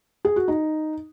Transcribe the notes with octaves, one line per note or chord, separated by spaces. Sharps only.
G#4
F#4
D#4